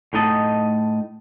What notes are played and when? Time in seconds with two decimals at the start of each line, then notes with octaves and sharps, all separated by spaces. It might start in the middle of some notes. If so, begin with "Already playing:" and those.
0.13 A2 A3 D#4 D#5 A5